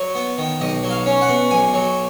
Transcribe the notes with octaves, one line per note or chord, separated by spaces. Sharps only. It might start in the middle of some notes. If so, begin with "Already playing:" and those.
Already playing: F#3
B3
D#3
B1 D#5
F#3
F5
C#4
F#5
B2
B1 G#5
F#3